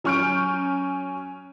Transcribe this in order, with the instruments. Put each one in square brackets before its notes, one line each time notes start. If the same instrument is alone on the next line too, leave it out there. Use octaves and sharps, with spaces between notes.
[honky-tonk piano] F#3 C#4 C#6 F6 G6 D7